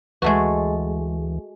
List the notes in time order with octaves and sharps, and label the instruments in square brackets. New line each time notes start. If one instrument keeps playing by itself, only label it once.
[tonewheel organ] D2 E3 [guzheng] G#3 A3 F#4